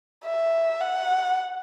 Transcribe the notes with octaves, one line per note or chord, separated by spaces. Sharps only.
E5
F#5